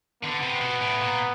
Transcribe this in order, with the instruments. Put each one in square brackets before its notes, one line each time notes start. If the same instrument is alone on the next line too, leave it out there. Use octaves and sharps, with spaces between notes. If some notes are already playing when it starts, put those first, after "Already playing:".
[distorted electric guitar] D3 [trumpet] B3
[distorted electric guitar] C3
B2
A2
A#2